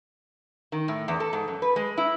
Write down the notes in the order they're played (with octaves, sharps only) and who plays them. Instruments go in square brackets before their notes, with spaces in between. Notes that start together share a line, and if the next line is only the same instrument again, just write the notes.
[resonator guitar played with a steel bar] D#3
A2
E2
A4
G#2
F#2
B4
G#3
E4